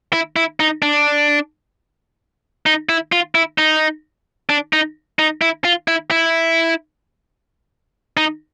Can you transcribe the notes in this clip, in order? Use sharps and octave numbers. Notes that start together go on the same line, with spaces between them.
E4
E4
D#4
D4
D#4
E4
F4
E4
D#4
D4
D#4
D#4
E4
F4
E4
E4
D#4